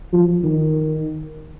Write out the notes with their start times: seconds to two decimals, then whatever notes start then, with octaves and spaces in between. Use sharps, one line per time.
0.13 F3
0.44 D#3